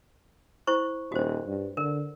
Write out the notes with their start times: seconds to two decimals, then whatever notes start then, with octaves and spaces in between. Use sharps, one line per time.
0.67 E4 C5 C#6
1.12 D#1 F#4 C5
1.46 G2
1.77 D3 A#4